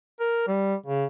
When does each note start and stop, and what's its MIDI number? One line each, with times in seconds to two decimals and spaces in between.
0.20 0.44 70
0.47 0.75 55
0.86 1.05 49